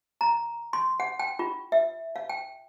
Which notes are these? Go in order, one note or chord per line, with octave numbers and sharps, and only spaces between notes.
A#5
C6
F#5
G5
F4
E5
F5
G5